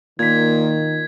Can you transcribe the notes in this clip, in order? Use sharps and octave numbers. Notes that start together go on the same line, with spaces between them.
A#2 D#3 G#6 B6